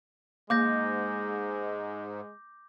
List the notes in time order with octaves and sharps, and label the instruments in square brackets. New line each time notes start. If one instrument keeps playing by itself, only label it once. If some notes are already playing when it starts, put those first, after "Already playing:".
[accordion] G#2 [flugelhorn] G#3 [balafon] A#3 [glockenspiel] D6 G6 A#6